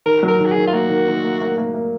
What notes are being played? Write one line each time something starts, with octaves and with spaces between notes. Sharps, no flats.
D#3 A#4
F#3 A#4
D#3
F#4
G#4
D#3
F4
A#3 F#4
D#3
D#3
A#3
A#3
A#3
A#3